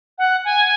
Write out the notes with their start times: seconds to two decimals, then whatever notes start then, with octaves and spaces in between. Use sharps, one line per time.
0.18 F#5
0.45 G#5